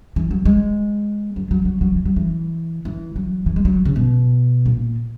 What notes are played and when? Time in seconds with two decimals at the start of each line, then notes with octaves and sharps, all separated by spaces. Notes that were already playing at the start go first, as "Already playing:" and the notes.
0.16 E3
0.31 F#3
0.45 G#3
1.36 F#3
1.51 F#3
1.65 F#3
1.81 F#3
1.96 E3
2.06 F#3
2.16 E3
2.85 E3
3.16 F#3
3.46 E3
3.56 G#3
3.65 F#3
3.85 C#3
3.96 B2
4.66 A#2